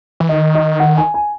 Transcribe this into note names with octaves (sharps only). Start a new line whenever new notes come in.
E3
D#3 D#5
D#5
F#5
G#5
G#5